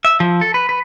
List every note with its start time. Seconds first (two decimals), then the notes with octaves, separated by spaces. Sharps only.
0.05 E5
0.20 F3
0.41 A4
0.54 B4
0.69 B4